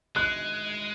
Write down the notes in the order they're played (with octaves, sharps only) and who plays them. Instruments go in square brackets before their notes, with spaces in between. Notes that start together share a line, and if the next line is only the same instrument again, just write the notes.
[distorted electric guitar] G#3 [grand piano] F#6